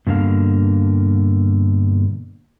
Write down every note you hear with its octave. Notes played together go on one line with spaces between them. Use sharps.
G2 B2 D3 A#3 F5